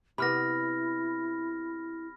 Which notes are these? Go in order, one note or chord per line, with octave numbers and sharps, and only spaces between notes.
C3 B3 E4 B5 F6 A#6